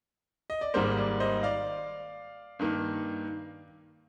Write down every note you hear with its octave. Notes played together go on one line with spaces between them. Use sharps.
D#5
D5
G#1 G#2 G3 A#3 C5
D5
C5 D#5
D5 F5
G2 D#3 A#3